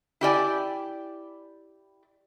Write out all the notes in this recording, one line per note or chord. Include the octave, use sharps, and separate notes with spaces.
E4 G4 D5 G#5